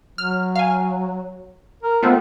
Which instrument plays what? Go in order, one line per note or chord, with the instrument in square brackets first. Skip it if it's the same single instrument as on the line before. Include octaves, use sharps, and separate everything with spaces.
[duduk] F#3 [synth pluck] F6
[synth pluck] F5 G#5
[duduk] A#4
[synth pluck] A3 B3 C4 [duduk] F4